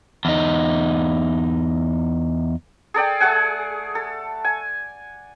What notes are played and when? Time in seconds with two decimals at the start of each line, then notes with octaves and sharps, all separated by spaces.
0.25 E2 D#4
2.94 G#4 A4 D5 G5
3.20 A3 G#4 F#5 G#5
3.95 A4
4.44 G#5